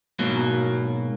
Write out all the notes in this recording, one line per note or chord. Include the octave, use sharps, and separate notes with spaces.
G#2 B2 F#3 A#3